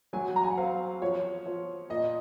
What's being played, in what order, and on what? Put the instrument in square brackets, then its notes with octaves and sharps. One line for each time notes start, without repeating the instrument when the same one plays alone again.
[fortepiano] F#3 [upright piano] G#5
[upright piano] A#5
G#5
F#5
[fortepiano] C4 [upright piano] F5
[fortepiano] F3 [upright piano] C#5
[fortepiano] F3
[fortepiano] A#2 [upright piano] D#5